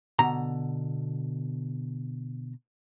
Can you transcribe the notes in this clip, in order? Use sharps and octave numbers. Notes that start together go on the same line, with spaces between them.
B2 D3 A#5